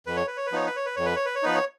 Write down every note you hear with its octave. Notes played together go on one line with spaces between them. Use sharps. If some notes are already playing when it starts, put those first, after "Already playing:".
F2 B4
C#5
B4
C#5
B4
F3 B3 D#4 C#5
B4
C#5
B4
F2 C#5
B4
C#5
B4
C#5
F3 B3 D#4 B4
C#5